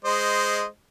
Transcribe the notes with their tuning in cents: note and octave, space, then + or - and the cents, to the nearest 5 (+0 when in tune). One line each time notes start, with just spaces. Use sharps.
G#3 +0 C5 -10 D#5 -10